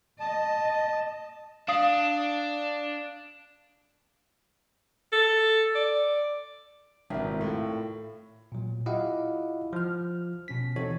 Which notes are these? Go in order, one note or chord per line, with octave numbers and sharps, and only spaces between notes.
D#5 A5
D4 F5 D#6 C7
A4
D5
G#1 C3 E4 A#4
A2 F4
A#2 F#3
E4 F4 G4 D#5 F5 F#5
F3 F6
B2 C#4 B6
E3 C4 D#4 F#4 A4 C#5